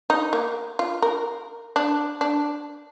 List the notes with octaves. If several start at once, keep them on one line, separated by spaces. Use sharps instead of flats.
D#4
A#3
F4
A#4
D4
D4